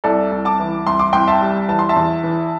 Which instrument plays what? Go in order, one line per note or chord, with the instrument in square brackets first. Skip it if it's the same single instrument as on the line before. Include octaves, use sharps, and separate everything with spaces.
[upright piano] C2 A4 D5
C2
A5 D6
E3
C2 C6
D6
C2 G5 C6
E5 A5
G3
E3 A5
C6
E5 A5
E2
E3